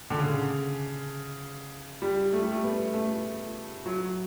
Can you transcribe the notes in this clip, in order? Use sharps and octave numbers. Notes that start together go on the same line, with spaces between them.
D3
C#3
G3
A3
G3
A3
B3
A3
F#3